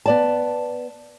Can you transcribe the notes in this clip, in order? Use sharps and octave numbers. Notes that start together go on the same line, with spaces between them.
B3 D5 A5